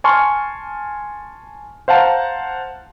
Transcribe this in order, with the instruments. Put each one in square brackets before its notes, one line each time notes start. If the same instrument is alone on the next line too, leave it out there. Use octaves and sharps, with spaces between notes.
[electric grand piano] G#5 A5 C6 C#6 F6
C5 F5 F#5 A5 A#5